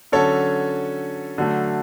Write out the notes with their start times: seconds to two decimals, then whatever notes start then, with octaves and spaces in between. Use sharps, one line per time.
0.12 D3 F#3 C#4 A4 C#5
1.38 D3 F#3 A3